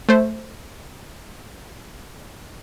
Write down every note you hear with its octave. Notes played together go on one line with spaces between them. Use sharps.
A3 C5